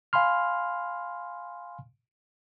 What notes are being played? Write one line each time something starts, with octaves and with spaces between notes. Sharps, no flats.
F5 G#5 B5 C6 F6